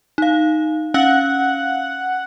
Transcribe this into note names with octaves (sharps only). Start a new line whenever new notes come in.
D#4 F5
C#4 F5 F#5